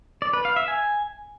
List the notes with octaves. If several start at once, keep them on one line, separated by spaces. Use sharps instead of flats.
D5
B4
F5
E5
G#5